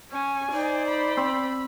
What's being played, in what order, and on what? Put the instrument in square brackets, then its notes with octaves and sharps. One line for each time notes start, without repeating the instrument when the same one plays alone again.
[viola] C#4 [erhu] G#5
[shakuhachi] D#4 [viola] C5 D5
[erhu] B5
[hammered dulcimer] C4